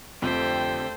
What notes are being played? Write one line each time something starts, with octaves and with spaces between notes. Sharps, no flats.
F2 D3 A3 C4 G4 A4 C5 G5